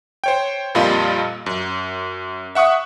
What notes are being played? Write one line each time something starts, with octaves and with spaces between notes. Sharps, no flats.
C5 C#5 G5
F2 A#2 G3 F4 D#5 B5
F#2
E5 F#5 C#6 D#6 F#6